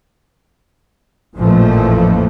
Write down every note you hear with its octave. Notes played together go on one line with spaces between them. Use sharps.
A1 F2 A#2 E3 F3 A3